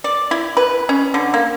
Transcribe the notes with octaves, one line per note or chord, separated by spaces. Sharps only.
D5
E4
B4
C#4
D3
A#3